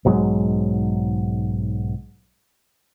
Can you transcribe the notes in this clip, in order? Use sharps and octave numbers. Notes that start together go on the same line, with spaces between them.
B1 G#2 F#3 G#3